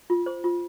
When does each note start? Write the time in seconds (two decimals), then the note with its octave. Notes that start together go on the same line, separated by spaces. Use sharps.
0.10 F4
0.26 C5
0.44 F4